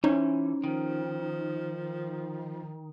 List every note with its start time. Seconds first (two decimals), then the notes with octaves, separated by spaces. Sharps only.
0.04 E3 C#4 D#4 C5 C#5
0.64 D#3 F3